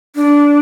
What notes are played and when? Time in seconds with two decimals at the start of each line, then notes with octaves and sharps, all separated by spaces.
0.16 D4